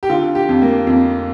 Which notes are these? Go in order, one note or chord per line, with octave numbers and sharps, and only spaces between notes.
G4
D3 F4
G4
F2
A#3
F2